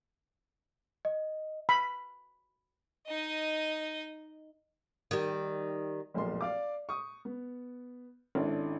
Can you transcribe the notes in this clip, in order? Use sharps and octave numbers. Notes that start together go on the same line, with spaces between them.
D#5
B5
D#4 D#5
D#3 G3
F1 B1 A#2 G#3 C6
D5 F5 D6
C#6 D#6
B3
G#1 C#4 D4 E4 A4